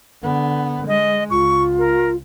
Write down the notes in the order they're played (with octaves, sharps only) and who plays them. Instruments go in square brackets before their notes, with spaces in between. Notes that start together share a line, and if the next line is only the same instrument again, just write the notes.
[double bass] D3 B3
[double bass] G#3 [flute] D#5
[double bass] C#2 [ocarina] F4 [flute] C#6
[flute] A#4